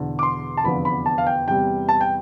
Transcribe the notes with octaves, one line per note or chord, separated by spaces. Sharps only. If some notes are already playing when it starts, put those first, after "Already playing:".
Already playing: E1 E2 D3
D6
C6
A5
F1 E2 D3 F3 B3 B5
B5
A5
F5
G5
E2 C3 G3 G5
A5
G5